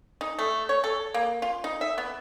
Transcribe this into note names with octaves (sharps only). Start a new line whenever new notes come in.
D#4
A3
C#5
A4
A#3
F4
D#4
E5
B3